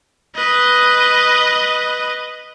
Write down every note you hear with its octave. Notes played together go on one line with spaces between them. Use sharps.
B4 D#5